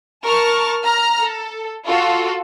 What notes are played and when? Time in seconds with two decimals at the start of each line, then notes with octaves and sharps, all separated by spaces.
0.25 A#4 A5 C#6 F6
0.84 A#5 F6
1.19 A4
1.87 F4 F#4 A4